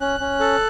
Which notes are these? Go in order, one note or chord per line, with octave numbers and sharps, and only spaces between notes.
C#4 F#6
C#4
A4